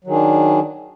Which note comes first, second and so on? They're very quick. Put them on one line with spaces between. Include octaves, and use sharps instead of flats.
F#3 D#3 G#4 D4